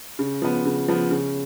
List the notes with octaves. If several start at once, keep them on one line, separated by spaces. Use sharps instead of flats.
C#3
F3 B3
C#3
F3 B3
C#3